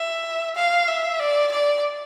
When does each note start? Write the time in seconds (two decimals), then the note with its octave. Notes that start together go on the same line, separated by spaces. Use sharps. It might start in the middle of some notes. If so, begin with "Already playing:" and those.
Already playing: E5
0.55 F5
0.88 E5
1.20 D5
1.51 D5